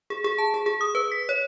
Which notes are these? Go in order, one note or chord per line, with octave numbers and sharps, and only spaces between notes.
G#4
G#4
A5
G#4
G#4
D#6
B4
B6
C#5